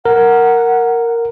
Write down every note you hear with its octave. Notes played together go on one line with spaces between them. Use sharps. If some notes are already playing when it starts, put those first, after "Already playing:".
A#4 F#5